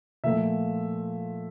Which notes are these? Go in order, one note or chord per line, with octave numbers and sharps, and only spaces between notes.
A#2 F3 A3 E5